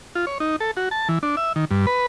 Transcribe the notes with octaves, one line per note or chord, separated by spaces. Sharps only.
F4
C#5
D#4
A4
F#4
A5
E3
D4
E5
D#3
G2
B4